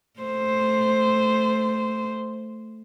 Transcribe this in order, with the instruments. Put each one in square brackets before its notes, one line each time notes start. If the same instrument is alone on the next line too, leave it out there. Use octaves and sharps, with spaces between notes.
[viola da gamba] A3 C5